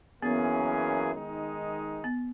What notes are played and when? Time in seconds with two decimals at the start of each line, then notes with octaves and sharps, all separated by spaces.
0.22 F#2 E3 A#3 B3 C#4 G#4
1.13 D#3 G#3 D#4
2.04 B3